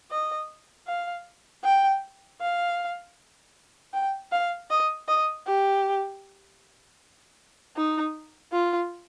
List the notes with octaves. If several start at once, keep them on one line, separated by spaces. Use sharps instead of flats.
D#5
F5
G5
F5
G5
F5
D#5
D#5
G4
D#4
F4